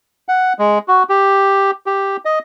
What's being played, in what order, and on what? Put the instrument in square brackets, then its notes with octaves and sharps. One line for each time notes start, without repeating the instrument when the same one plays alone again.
[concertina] F#5
G#3
F#4
G4
G4
D#5